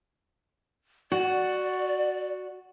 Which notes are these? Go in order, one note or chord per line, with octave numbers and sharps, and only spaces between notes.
F#4 D5